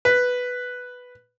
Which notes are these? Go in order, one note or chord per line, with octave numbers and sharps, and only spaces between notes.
B4